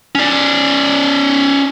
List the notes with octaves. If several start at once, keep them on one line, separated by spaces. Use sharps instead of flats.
C#4 D5